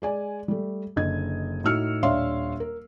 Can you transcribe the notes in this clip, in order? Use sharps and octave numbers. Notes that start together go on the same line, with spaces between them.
G#3 D5 G#5
G3 A3
F#1 D3 D#5 G#6
A2 D#4 F#4 E6 F6 C#7
D#1 D4 C#5 E5 F5 C6
A#4